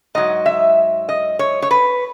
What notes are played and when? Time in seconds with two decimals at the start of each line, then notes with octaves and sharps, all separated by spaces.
0.15 G#2 F#3 D#5
0.46 E5
1.09 D#5
1.39 C#5
1.62 C#5
1.71 B4